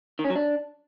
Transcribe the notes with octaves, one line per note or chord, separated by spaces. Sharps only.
D#3
C#4
F#3
D4